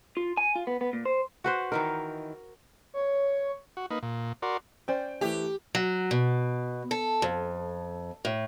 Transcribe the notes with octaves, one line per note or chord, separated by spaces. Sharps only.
F4
G#5
F4
B3
B3
A#2
C5
F#4 B4 C5
D#3 E3 D#4 A#4
C#5
F#4
A#3 D#4 B4
A#2
F#4 A#4 D5 C6
C#4 C5 D5 G5
E3 A3 G4
F#3
B2
A4
F2
A2